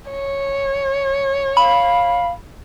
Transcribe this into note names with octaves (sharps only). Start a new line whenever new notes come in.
C#5
F5 B5